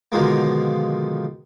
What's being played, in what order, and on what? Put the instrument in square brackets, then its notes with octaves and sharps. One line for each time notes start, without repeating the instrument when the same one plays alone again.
[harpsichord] B2 D3 D#3 F3 G#3 A#3